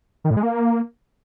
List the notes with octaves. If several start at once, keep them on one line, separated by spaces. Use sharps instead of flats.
D#3
A2
G#3
A#3